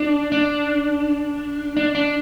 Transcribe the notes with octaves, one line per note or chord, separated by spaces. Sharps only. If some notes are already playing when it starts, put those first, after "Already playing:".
Already playing: D4
D4
D4
D4